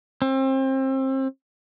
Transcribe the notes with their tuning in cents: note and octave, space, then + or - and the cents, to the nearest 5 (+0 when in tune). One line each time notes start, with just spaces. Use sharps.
C4 +30